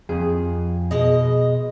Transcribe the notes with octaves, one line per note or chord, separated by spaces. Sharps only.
F2 G#4
B2 G#3 D#5